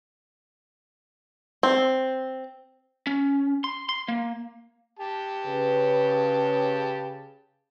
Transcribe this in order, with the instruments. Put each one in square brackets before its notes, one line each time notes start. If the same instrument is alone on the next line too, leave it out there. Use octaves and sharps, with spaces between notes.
[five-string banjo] C4
[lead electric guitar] C#4
C6
C6
A#3
[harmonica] G4 A5
[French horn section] C#3 B4